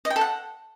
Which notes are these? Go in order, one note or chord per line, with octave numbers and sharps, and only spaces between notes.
D#5
G5
A4
F#5